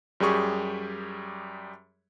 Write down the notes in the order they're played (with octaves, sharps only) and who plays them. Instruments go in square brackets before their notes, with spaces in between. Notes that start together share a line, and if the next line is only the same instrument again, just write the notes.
[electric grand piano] F#2 G3 G4 G#4 C#6